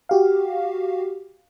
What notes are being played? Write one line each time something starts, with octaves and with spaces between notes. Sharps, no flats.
F#4 G4 F5